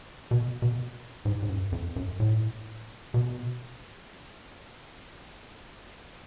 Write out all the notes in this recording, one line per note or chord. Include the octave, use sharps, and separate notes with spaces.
B2
B2
G#2
G#2
F#2
F2
F#2
A2
B2